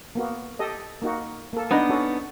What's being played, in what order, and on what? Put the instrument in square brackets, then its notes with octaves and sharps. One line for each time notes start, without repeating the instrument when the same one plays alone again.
[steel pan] A#3 B3 F#4
G4 A4 D#5
A#3 D#4 F#4
A#3 A4
[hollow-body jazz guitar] B3 D4 D#4
[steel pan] C#4 F#4 A4